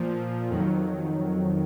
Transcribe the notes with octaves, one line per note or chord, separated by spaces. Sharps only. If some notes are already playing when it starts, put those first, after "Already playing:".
Already playing: A#2 F3
F2 D#3 F#3